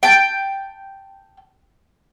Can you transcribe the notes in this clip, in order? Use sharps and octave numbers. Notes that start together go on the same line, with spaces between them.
G5 A5